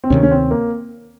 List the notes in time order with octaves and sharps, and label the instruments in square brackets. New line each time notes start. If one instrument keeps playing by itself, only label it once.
[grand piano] C4
[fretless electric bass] D2 C3 D#3 [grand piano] C#4
[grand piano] C#4
C4
A#3